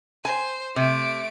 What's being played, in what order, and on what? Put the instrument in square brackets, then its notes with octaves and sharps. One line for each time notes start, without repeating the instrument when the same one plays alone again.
[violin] C5 [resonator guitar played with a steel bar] G#5
[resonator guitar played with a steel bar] C3 [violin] A3 D7